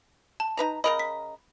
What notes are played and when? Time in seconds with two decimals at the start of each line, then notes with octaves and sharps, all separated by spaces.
0.40 A5
0.57 D#4 B4 A#5
0.84 C#3 A#4 D#5 B5
0.99 B6